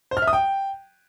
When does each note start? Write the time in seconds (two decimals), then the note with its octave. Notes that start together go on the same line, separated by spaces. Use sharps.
0.11 C5
0.17 F6
0.22 E5
0.28 D#6
0.33 G5